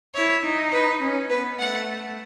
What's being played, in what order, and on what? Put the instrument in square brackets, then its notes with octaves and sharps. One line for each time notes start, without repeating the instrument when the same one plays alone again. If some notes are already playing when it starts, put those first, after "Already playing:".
[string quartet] E4 [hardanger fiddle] C#5
[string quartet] D#4
[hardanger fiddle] B4
[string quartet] C#4
[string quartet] B3 [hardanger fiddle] B4
[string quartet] A3 [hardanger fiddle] F#5